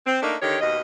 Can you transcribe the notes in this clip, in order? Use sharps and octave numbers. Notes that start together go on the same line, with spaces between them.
C4
A3 A#3 D4 D#4
D3 D#3 G4 C#5
D#2 B2 D#5